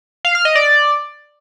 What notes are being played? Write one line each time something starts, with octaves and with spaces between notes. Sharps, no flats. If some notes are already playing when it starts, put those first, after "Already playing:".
F5
F6
D#5
D5